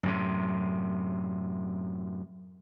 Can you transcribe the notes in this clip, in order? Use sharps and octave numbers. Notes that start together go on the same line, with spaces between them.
F#2 A2 C3